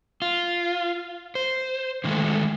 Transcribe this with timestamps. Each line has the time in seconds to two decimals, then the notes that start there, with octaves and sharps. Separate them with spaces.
0.22 F4
1.35 C5
2.04 D3 D#3 F3 G#3 A3